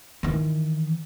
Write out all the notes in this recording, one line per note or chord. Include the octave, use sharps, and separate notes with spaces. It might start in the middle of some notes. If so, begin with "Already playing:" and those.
D#3 E3